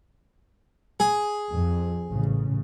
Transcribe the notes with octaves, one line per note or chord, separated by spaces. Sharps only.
G#4
F2
A1 C#3